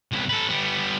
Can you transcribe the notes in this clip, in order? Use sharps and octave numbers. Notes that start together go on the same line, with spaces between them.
C2 B3
A4 B4
G3 B3